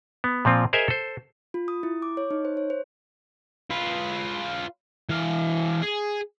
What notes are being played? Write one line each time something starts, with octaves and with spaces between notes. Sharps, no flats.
B3
A#2 F3 C4 F4
G#4 A#4 C5 D#5 E5 G#5
A4 C5
F4
D#6
E4
D6
C#5
D#4
C5
C#5
C5
F4 B4
E3 F5
G#4